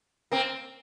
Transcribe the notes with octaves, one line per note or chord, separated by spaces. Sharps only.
A#3 C4